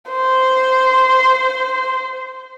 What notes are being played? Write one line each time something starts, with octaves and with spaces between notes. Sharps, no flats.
C5